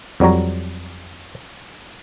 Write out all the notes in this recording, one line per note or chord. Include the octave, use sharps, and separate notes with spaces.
F2 F#3 G3 C#5 A#5